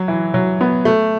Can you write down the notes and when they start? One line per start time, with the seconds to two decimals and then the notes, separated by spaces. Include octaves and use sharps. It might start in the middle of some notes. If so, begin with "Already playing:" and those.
Already playing: F#3
0.08 E3
0.34 F#3
0.61 B3
0.85 A3